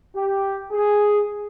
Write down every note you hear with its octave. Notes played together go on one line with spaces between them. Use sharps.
G4
G#4